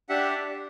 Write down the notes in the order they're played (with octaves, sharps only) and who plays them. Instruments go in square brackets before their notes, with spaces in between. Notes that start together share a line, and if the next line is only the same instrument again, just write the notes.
[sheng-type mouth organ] D4 G4 E5 F#5